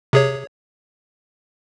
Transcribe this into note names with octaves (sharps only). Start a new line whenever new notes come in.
C3 G#4 C#5